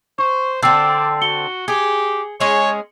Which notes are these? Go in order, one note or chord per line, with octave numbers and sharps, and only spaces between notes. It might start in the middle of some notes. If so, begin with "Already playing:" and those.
C5 C#6
D3 C4 D5 G5 E6 C7
F#4 C#7 G7
G4 G#4
G#3 C#4 G#4 C#5